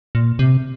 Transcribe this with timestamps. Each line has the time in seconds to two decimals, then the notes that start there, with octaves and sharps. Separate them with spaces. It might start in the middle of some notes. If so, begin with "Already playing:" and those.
0.15 A#2
0.39 C3